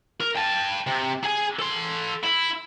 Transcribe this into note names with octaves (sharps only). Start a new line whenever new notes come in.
A#4
G5 A5
C3
G#4 G#5
A4 C6
E4